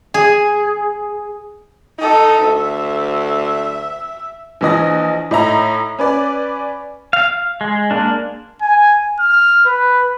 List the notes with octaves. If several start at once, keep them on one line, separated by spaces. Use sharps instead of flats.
G#4
D#4 A4 D#5
D2 E5
A#1 E3 D#5 A#6
A2 D#4 E5 A#5
C#4 B4 D5
F5
G#3
G#3 A#3 D4
G#5
F6
B4